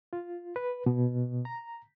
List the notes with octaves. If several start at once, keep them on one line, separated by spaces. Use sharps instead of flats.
F4
B4
B2
A#5